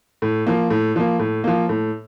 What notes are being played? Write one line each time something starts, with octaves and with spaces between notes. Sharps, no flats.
A2
F3 A#3
A2
F3 A#3
A2
F3 A#3
A2